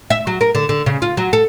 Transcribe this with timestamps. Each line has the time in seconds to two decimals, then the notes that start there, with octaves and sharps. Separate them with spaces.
0.10 E5
0.27 F#3
0.41 A#4
0.55 D3
0.69 D3
0.86 C#3
1.02 F4
1.17 F#3
1.33 A4